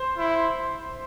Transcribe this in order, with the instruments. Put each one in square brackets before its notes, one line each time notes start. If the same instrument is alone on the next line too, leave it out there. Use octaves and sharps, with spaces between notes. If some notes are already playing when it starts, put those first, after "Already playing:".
Already playing: [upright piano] C5
[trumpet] E4